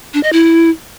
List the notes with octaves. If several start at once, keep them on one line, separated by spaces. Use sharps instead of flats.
D4
D#5
E4